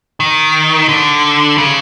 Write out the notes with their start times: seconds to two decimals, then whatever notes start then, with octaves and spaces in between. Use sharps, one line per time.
0.20 D#3
0.89 D3
1.58 C#3